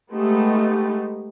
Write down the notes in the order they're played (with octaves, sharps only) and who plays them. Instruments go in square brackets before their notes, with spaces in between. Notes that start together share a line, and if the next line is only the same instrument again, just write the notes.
[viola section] G#3 A3 B3 D#4 G4